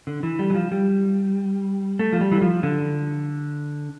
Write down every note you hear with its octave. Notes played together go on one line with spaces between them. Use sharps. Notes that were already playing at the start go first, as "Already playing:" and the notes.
D3
E3
G3
E3
F3
G3
A3
F3
G3
E3
F3
D3